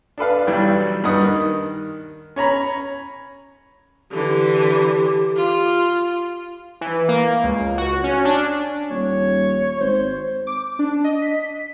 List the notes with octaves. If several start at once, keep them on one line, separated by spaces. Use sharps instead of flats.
D4 A4 B4 F5
B1 E3 F#3 G3 G5
G2 G3 D#4 F#5 D#6
D#3
C#4 C#5 A#5 B5
D3 E3 G4
F4
E3
A#3
C#2
F#4
C#4
D4
D#1 C#5
G#1 C5
D6
D4
D#5
B6